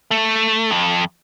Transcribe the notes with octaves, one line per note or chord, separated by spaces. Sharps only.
A3
F2